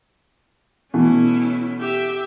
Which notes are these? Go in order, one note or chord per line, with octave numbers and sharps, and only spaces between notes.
B2 E3 A3 C#4 E4
G4 E5